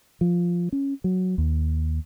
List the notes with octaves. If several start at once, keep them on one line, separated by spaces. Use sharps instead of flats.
F3
C#4
F#3
D#2